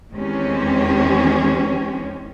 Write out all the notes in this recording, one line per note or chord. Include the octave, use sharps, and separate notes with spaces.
E2 D#3 G#3 C4 C#4 G4